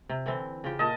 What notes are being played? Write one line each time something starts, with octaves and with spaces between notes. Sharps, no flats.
C3
D3 E3 C4
C#3 F4 G4
A#2 D4 D#5 A5